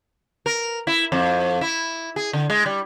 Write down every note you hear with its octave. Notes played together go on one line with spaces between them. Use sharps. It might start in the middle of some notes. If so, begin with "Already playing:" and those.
A#4
E4
F2
E4
G#4
D3
G#3
G3